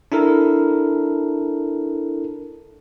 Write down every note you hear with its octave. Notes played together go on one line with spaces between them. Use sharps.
D4 E4 A4 A#4